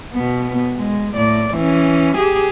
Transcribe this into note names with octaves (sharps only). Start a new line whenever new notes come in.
B2 B3
G#3
A2 D5
E3 C#4
G4 G#4